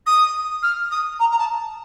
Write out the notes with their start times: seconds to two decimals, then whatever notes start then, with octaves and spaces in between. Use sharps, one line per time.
0.06 D#6
0.62 F6
0.91 D#6
1.19 A#5
1.31 A#5
1.38 A5